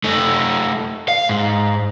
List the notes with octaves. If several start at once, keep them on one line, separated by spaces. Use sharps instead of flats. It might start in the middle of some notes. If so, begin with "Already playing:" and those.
A3 D#4
F5
G#2